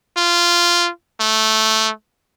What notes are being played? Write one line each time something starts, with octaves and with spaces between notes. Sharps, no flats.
F4
A3